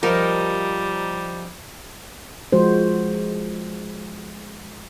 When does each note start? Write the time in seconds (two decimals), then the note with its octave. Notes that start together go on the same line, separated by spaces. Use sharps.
0.03 F3 G3 D#4 F4 G4 A#4
2.53 F3 G#3 F#4 C5